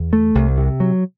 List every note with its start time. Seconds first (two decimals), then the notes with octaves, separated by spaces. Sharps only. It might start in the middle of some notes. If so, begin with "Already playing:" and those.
Already playing: E2
0.13 A3
0.35 C2
0.58 C3
0.80 F#3